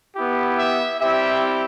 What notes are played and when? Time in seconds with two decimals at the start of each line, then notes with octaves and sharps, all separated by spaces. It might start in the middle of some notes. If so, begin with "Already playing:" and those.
0.14 B3 E4 G4
0.58 E5
1.00 G3 C4 E4 G4 E5